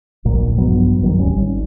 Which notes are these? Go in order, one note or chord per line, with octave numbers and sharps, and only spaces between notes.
D1 A#1 A#2 A#3
A#1 G2 F#3 B3
F#2 D#3 F#3
D1 G3 C#4
G#1